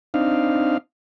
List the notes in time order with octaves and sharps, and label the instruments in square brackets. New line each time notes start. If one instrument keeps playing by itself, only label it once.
[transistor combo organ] C4 D4 D#4 F5